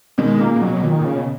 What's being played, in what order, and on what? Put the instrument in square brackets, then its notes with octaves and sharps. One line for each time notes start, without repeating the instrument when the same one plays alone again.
[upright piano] B2 D#3 [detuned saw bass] G#3
[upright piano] A#2 C#3 [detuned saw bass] A#3
[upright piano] A#2
[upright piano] B2 [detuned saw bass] F#3
[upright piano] B2
[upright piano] A#2 [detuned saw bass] D#3
[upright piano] A#2
[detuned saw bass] C#3
[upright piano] B2